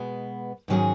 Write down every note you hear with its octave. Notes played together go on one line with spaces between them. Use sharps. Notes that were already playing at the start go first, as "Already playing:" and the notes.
Already playing: B2 G#3 B3
G#2 D#3 F#3 C#4 G#4